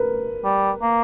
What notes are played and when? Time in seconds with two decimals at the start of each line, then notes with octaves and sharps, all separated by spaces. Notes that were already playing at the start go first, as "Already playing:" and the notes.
Already playing: A#4 B4
0.45 G3
0.82 A#3